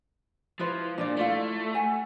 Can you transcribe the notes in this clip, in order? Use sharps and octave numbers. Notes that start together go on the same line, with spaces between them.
F3 E4 B4 C5
A#2 D4 F4 D5
A3 E4 F4 F5
F#5 G#5